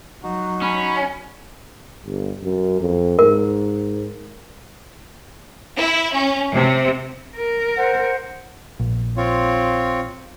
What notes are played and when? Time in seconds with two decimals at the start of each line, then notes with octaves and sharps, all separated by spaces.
0.24 F#3 D#4 F#4
0.62 C#4 B5
2.05 G1
2.43 F#2
2.80 F2
3.19 G#2 A#4
5.76 E4
6.13 C#4
6.53 C3
7.37 A#4
7.76 C5 F#5
8.80 A#1
9.17 C4 F4 C#5